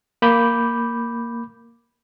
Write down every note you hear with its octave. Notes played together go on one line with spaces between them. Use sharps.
A#3 B5 D6 G6